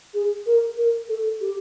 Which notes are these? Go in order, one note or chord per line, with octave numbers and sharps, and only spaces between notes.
G#4
A#4
A#4
A4
G4